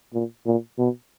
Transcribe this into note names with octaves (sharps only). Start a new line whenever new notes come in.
A#2
A#2
B2